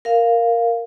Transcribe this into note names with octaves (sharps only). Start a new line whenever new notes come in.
A#4 F5